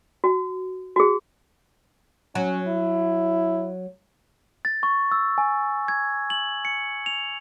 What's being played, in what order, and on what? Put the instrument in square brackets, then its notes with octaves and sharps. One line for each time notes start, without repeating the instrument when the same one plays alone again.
[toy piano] F#4
F#4 G#4
[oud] F#3 [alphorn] C#4
[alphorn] E4
[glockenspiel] A6
C#6
E6
G#5
G#6
F#7
C#7
F7